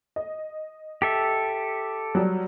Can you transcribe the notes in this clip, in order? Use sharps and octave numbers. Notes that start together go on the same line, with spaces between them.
D#5
G4 A4 E5
F#3 G3